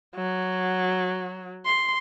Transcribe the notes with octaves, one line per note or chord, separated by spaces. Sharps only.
F#3
C6